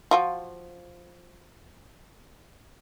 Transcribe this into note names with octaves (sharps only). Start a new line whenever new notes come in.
F3 F4 F#4